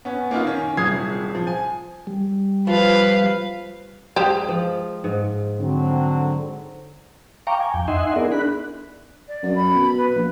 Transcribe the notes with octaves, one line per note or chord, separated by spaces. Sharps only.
B3 C#4
A#3 B3 D#4 F4
D#3 C#4
D#1 C2 G#4 D#6 G#6 C7
F3
G#5
G3
F3 B4 F5
G#3 G4 C5
F3
G#2
D3 F#3 C4
F5 G5 A#5 C#6 D6
G#5
F2 G5
D#4 D#5 E5 F#5 G#5 C6
B3 E4 G#4 A#4 D5
D4 B5 F#6
D5
F#2
B5
B2
B4
A#1